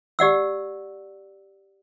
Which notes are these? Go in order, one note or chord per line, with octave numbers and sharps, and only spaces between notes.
G4 D5 F#5 E6